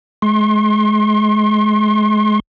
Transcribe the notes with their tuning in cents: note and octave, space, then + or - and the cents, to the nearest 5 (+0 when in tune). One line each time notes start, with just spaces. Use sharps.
G#3 +30 C6 +40